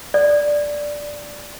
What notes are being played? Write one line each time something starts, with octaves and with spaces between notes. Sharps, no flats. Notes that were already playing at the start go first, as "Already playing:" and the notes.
D5